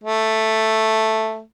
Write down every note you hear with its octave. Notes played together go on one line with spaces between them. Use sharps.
A3